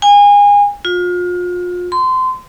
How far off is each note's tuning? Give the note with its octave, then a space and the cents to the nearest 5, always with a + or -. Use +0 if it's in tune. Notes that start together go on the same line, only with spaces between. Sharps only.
G#5 -30
F4 +35
C6 -25